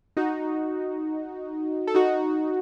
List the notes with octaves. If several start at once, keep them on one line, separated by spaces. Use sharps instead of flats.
D#4 F#4
A4
D#4 F#4